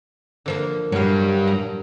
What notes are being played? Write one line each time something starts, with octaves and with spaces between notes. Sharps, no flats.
D3 F3 A#3
G2 F#3 G3 F5
A#5